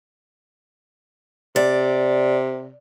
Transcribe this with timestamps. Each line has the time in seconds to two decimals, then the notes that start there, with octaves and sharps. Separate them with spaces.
1.56 C3 D5